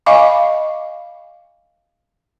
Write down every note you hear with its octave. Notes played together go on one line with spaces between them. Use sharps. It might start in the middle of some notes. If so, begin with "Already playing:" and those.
D#5 F5 G#5 B5 C#6 D6